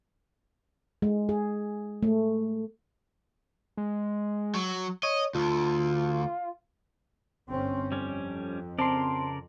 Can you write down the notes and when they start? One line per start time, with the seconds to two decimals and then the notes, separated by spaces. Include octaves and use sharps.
1.02 G#3
1.29 G#4
2.03 A3
3.77 G#3
4.55 F#3
5.03 C#5 D#5
5.35 D2 F4
7.50 G1 C4 C#4
7.92 F2 G3 C#4
8.79 C#3 C4 A#4 D5 A5 C6